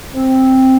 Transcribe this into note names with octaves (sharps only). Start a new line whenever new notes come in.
C4